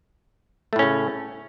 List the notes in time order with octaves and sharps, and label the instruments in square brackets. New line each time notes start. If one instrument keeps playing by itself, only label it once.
[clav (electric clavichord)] A3
A2
C#4
C#3